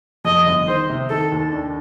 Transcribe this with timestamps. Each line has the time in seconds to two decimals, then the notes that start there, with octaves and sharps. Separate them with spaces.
0.25 F2 D#5
0.46 G1
0.67 D#3 C5
0.89 C3
1.10 D#3 A4
1.32 D#2
1.52 D4